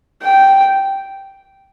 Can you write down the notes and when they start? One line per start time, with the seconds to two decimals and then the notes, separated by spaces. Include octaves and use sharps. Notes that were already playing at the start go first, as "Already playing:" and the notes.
0.22 G5